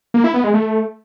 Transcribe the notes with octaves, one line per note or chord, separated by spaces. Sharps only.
A#3
E4
B3
G#3
A3